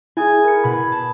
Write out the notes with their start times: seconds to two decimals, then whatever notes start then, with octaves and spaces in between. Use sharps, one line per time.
0.17 E4 G#4 G#5 D#6
0.45 A#4 C#7
0.64 B2 B5 G#6
0.92 A5